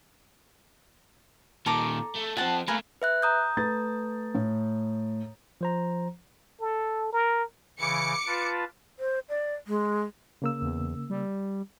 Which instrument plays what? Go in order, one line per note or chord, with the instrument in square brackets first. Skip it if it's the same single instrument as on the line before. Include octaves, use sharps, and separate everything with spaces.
[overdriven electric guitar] A#2 D#3 [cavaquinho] A4 A#5 D6
[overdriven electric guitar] A3
[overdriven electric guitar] F3 C4 [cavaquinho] F#5 A5
[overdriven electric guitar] A3 A#3 [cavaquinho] A#4 B4 G#5
[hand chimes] B4 E5 F#6
A#5 D#6 G6
[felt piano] A3 B4 A6
A2
[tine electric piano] F3 C5 A#5
[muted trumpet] A4
A#4
[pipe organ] C#3 E3 [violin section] D6 C#7
[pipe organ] F4 B4 A5
[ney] C5
D5
G#3
[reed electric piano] C#3 A#3 E6
[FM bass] E2
G3